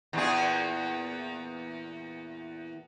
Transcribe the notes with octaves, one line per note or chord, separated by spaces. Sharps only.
E2 A#2 G#4